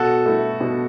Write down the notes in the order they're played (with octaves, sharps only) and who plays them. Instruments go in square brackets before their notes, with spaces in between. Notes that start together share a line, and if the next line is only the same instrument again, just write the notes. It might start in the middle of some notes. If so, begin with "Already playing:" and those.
Already playing: [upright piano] B2 [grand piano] F#4 A4
[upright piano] A3 E4
B2